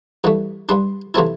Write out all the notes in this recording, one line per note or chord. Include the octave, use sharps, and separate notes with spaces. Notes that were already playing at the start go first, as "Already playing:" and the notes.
G2 E3 A3
G2 G3 D4 C6
C3 E3 A3 C4 E4 A5